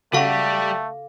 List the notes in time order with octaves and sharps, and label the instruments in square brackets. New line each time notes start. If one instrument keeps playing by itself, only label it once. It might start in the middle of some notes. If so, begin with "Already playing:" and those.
[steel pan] C#3 F#4 [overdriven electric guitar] G3 [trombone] A3 [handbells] A4 F5